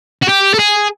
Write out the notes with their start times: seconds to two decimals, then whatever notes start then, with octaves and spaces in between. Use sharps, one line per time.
0.22 F#4
0.28 G4
0.54 A4
0.59 G#4